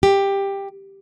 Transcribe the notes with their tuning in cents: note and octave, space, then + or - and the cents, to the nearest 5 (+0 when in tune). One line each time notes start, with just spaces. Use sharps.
G4 +10